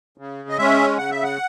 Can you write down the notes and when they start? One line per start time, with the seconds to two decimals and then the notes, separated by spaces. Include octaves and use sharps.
0.18 C#3
0.49 D#5
0.58 G#3 C#4 E5
0.98 C#3 F#5
1.11 E5
1.23 F#5